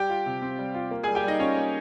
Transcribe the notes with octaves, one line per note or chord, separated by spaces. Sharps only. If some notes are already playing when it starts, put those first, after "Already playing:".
Already playing: G3 G4 G5
F4
C3
C4
G3
F4
A#3
G#4 G#5
G3
G4 G5
G3 D#4 D#5
C#4 F4 C#5
A#3